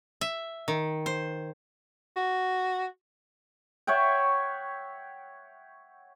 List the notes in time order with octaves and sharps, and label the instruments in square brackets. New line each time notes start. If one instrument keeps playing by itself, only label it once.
[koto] E5
D#3
C5
[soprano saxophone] F#4
[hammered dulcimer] C#5 E5 F#5 G5